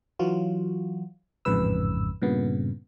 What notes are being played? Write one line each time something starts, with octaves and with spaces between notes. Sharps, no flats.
E3 F#3 F4 F#4
A1 F2 G#2 C#3 B4 E6
G2 A#2 C#3 B3